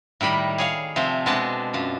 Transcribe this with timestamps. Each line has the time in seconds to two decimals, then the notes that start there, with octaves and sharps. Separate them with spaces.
0.21 A2 D#3 G3 B5
0.58 G#4 C#5 F5
0.96 C3 F3 A3 C5
1.26 B2 G#3 C4 D4 C5 A5
1.73 F#2 F4